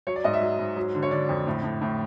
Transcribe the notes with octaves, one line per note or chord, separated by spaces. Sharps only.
F#3 C#5
D5
G#2 D#5
E5
F#3
G#2
F#3
D3
C#5
D3 D5
F2
A2
A2
A2